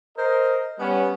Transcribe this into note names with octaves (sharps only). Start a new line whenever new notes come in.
A#4 C5 D#5
G3 B3 C#4